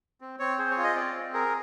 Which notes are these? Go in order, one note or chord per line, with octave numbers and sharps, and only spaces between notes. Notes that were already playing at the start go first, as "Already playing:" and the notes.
C4
C4 C#5
G#4 C5
C#5
F4
D#5
C4 D5
C4
G#4 A#4